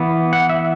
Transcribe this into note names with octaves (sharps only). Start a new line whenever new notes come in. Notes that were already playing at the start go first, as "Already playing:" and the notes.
Already playing: E3 B3
F#5
E5